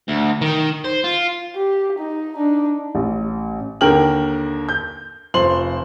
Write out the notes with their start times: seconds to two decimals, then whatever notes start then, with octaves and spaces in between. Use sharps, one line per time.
0.08 D2
0.41 D#3
0.84 C5
1.04 F4
1.56 G4
1.99 D#4
2.36 D4 D#4
2.95 A1
3.81 D#2 D3 A#4 G5 F6 F#7
4.69 G6
5.34 F1 F3 C5 C6 F#7